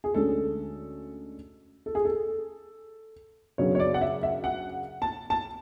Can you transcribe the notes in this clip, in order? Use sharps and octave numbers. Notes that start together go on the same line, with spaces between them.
G#4
D2 D3 G#3 C#4 A4
A4
G#4
A4
F#2 C#3 F#3 B3 D4 C#5
C#5
D5
F#5
E5
E5
F#5
A5
A5